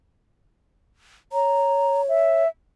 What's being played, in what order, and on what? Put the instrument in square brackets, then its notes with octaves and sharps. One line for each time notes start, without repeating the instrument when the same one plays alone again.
[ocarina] C#5 [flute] A#5
[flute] E5